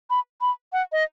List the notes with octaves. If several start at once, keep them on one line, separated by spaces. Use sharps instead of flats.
B5
B5
F#5
D#5